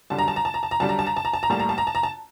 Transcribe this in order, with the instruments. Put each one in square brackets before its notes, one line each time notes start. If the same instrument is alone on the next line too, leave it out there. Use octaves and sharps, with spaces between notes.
[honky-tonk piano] F#2 D3 G3 A5
A#5
A5
A#5
A5
A#5
A5
A#5
F#2 D3 G3 A5
A#5
A5
A#5
A5
A#5
A5
A#5
A2 G3 A#3 A5
A#5
A5
A#5
A5
A#5
A5